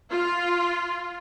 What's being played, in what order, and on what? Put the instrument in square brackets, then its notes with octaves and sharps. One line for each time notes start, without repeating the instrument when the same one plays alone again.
[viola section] F4